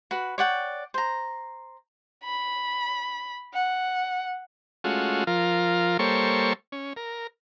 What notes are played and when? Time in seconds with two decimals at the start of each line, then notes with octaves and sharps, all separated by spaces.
0.11 F#4 B4
0.38 C#5 D5 F#5 G5
0.94 C5 A#5
2.24 B5
3.54 F#5
4.84 G#3 A3 C#4 F4 F#4
5.27 F3 F4 A#4
5.99 G3 A#3 A4 C5 C#5 C#6
6.72 C#4
6.96 A#4